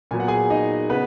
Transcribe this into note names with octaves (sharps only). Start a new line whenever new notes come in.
A#2 F#3 B3 G#5
F#5
G#4 G#5
D#4 D#5
C#3 B3 B4